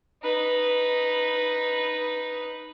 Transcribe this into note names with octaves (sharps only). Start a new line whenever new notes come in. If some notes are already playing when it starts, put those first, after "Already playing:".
D#4 B4